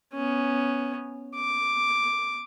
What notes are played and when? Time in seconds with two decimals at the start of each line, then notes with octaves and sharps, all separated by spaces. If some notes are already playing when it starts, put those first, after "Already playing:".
0.13 B3 C#4
1.36 D6